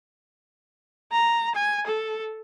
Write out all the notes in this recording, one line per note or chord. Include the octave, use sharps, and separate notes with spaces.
A#5
G#5
A4